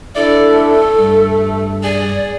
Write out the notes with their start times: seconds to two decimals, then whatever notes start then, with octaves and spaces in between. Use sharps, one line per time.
0.16 D4 E4 A4 D5
0.48 A3
0.98 G2
1.83 G#4 D5